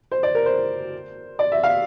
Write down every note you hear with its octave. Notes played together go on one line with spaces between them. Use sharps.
C5
D5
A#4
C5
D5
E5
F5